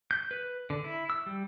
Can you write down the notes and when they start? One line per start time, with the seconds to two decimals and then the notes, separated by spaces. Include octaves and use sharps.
0.11 G6
0.31 B4
0.70 D3
0.84 E4
1.10 E6
1.26 G3